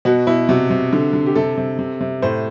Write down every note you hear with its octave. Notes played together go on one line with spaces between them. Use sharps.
B2 F#4
B2 E4
C3 F#4
C3
D3
D3
G4
C3 A4
C3
C3
C3
A2 C5